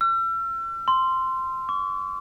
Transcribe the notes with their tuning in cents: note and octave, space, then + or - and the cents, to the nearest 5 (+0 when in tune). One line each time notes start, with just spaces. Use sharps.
E6 +40
C6 -5
C#6 +45